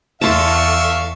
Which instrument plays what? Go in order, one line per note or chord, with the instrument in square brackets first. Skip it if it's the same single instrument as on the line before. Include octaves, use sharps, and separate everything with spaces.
[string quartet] E2 A4 C#6 [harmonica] E5 F5 [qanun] A5 C6